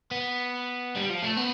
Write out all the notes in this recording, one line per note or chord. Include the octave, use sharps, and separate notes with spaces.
B3
G3
F3
A3
B3